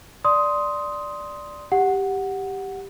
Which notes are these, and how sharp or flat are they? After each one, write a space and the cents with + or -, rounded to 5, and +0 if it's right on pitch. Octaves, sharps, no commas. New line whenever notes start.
D5 +0 C6 +0 D#6 +10
G4 +0 F#5 +0